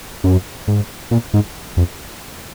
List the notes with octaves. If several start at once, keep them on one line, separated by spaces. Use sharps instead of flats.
F#2
G#2
A#2
G#2
F2